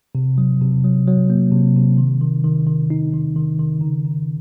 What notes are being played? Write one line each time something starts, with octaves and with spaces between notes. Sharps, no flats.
C3
F#3
C3
F#3
F#3
A#3
C3
C3
D#3
D#3
D#3
D#3
D#4
D#3
D#3
D#3
C#3
C#3